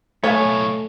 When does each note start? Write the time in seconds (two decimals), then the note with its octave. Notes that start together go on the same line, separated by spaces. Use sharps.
0.24 B1 A2 A3 C#5 E5 F5 G#5